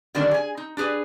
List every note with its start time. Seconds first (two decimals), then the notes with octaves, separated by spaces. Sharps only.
0.15 D3 D#3 F#3 G3 A#3 D4
0.31 G#4 G#5
0.57 D#4
0.77 D4 G4 G#4 B4